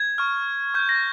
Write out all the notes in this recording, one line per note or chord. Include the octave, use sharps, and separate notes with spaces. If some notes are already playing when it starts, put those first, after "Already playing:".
Already playing: G#6
C#6 F6
C#6 F6 G6
A#6